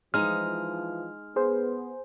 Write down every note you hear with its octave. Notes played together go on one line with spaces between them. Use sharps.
E3 F3 G#3 D#4 F6
B3 G#4 C5